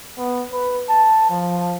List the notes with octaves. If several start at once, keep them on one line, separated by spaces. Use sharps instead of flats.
B3
B4
A5
F3